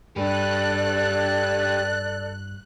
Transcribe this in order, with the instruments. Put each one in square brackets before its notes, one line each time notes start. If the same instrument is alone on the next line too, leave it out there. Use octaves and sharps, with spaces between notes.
[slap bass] G2 [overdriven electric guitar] G4 B4 [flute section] A4 D5 [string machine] F#6